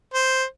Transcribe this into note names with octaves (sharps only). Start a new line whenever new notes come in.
C5